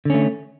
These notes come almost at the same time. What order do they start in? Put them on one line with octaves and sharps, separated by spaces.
D3 C#4 A3